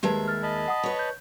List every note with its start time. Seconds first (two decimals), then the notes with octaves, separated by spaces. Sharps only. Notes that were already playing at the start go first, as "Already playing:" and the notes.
0.03 D#2 G#3 G4 B4 E5 A5
0.28 F6 A6
0.43 D#5 A5 B5
0.68 F#5 D#6
0.83 B4 C#5
0.99 G6